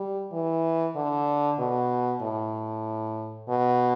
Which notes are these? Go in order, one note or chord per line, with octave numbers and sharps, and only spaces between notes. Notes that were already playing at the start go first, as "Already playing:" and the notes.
Already playing: G3
E3
D3
B2
A2
B2